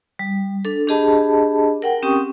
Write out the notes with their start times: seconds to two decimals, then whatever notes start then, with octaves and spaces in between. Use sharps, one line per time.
0.19 G3
0.65 D4 A4
0.87 D4 G4 G#4 D#5 A5 B5
1.82 A#4 F#5 G5
2.02 C4 C#4 G4 G5 C#6 D#6